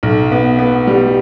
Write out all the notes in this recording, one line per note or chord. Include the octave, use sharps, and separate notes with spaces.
B1
B3
B3
G3